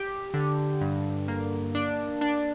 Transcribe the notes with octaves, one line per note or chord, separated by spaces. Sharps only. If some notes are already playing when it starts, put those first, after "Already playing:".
Already playing: G4
D3
G2
A#3
D4
D4